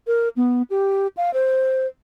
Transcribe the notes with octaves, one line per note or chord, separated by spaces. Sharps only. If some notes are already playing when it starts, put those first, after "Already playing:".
A#4
B3
G4
F5
C5